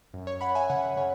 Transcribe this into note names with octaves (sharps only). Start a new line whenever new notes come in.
F#2
C#5
F#2 F#5 B5
E5 G#5
C#3 C#5 F#5
C#3 C#5